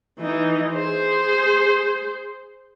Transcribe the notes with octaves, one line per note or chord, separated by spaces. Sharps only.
E3 D#4
G#4 C5